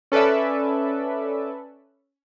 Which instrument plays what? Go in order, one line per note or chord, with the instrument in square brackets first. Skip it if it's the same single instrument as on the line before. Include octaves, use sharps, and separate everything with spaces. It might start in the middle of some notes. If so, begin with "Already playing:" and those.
[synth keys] C#4 A4 B4 D5 E5